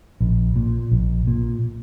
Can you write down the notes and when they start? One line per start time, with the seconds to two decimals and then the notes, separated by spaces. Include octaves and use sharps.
0.21 A#1
0.56 A#2
0.91 A#1
1.27 A#2